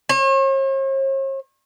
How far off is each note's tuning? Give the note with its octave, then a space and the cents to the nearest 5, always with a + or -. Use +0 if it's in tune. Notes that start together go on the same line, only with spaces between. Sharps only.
C#5 -45